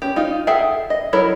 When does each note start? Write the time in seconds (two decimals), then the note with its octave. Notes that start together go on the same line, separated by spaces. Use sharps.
0.02 C#4 G4
0.16 D#4 F4
0.47 G#4 A4 E5 F#5 G5
0.90 D#5
1.13 F#3 E4 A4 A#4 C#5